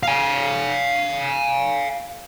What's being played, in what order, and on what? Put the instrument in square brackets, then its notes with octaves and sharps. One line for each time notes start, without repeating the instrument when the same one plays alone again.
[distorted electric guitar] F5 G#5